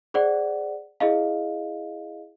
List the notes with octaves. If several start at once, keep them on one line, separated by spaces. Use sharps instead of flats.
G#4 C5 D5 F#5
E4 G#4 D#5 F5